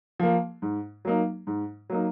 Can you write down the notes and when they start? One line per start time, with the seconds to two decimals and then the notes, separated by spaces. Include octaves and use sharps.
0.19 F3 A#3
0.62 G#2
1.05 F#3 A#3 D#4
1.47 G#2
1.90 F#3 A#3 D#4